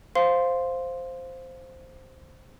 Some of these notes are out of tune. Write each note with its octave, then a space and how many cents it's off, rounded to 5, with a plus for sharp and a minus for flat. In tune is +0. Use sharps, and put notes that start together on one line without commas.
C5 +0 F5 +0 C6 +0